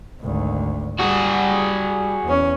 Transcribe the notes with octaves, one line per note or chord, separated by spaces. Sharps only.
G#1 D2
G3 F#4 G#4
E2 C#4